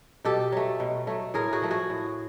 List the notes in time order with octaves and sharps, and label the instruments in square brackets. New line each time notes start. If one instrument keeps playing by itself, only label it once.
[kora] B2 G4 A4
F#3 A3
B2
F#3 A3
A2 G#4 A#4
F#4 G#4
F3 A3
F#4 G#4
A2